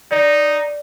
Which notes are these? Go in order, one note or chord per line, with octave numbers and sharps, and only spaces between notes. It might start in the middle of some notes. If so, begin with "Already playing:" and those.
D#4 D5